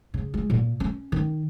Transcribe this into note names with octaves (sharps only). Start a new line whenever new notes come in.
C#3
G#3
A#2
C#4
D#3